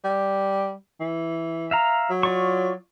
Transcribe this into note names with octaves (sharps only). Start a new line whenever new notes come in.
G3
E3
E5 F5 A#5
F#3
F4 D5 C#6